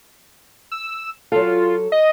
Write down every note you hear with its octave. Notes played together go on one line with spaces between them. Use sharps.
E6
F#3 F4 A4
D#5